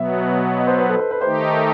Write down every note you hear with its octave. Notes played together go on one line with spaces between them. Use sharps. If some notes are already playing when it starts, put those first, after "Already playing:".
Already playing: B2 F#3 B3 E5
D#5
C5
B4
A4
B4
B4
D#3 A3 D#4 G4 C5